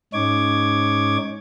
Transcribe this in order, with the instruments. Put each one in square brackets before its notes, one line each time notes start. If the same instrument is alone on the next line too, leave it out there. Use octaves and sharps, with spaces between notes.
[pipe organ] G#2 C#4 D#4 C#5 D6 G#6